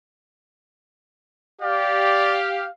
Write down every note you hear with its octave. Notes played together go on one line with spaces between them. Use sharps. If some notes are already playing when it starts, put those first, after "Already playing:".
G4 D5 F5